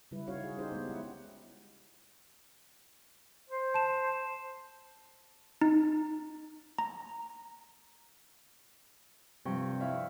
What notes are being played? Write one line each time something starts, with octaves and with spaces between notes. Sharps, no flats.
C#3 G3 E4 B4
C#4 D#4 E4 F#4 C#5 F5
G#4
C#4 D#4 G4 C5
G#3 B3
E4 F#5
C5
A5 E7
D#4
A#5
G2 C3 F3 G5 C#6
E4 C#5 E5 F5